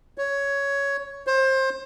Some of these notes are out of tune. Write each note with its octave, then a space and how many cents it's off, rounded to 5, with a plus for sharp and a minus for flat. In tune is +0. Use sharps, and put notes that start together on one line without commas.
C#5 +10
C5 +25